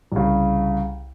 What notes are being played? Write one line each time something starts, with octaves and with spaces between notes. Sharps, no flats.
C2 C#3